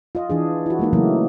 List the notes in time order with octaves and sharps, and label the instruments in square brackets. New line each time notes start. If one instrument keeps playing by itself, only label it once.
[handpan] F4 D#5
E3 D4 G#4
E4 F#4
G#3 A#3 D#4
C#3 E3 F#3 A3 A#3